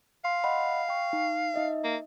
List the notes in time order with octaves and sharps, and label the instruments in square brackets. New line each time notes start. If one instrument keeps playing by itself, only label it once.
[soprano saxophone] F5 [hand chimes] C6
[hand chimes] D#5 F#5 B5
G5 C#6
D#4
D#4 D#5 E5
[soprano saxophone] A#3